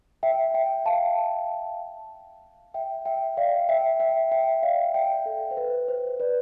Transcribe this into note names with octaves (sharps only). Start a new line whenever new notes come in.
E5 G5
E5 G5
F5 A5
E5 G5
E5 G5
D5 F5
E5 G5
E5 G5
E5 G5
D5 F5
F5
E5 G5
A4
C5
B4
C5
B4 D5